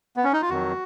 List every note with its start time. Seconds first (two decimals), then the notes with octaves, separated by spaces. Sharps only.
0.17 B3
0.24 C#4
0.33 D#4
0.42 F4
0.50 F2 D#3 F#3 F#4